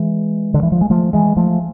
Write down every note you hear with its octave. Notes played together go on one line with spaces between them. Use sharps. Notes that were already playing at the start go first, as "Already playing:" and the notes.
Already playing: E3 G#3
D3
E3
F3
G#3
F3 A3
E3 G#3
F3 A3